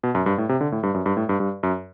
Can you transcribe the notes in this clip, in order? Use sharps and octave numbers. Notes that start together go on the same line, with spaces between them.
B2
F#2
G2
A2
C3
D3
A2
G2
F#2
G2
A2
G2
G2
F#2